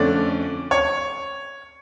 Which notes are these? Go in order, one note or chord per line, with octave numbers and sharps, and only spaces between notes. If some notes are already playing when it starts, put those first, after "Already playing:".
Already playing: F2 D3 A3 C#4 D5
C#5